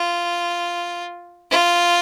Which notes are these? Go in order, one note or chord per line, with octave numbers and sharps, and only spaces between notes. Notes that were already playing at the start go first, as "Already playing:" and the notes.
Already playing: F4
F4